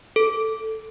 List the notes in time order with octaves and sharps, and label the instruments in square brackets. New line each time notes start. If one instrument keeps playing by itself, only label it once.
[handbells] A4